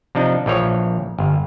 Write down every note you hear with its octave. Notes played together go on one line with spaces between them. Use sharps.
C3 F3 D4 D#4
A#1 E3 F3 C#5
G1